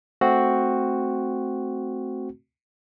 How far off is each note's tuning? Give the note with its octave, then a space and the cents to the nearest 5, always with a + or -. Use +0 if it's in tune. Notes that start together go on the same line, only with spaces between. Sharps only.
A3 +0 C4 +0 F#4 +0